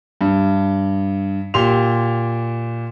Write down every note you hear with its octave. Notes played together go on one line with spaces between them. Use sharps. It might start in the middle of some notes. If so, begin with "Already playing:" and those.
G2
A#2 G4 C6 F7